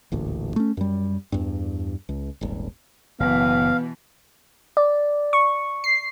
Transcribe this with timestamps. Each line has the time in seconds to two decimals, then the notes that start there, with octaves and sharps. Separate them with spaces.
0.12 D#1 A1 D2
0.56 A3 C#4
0.77 F#2 G3
1.32 E2 G2
2.09 C#2
2.41 D#1 G#1
3.20 F#1 B2 E3 B3 F5
4.77 D5
5.33 C#6
5.84 C7